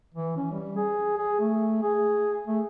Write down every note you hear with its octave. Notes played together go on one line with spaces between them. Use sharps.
E3
C#4
G3
G#4
G#4
A3
G#4
A3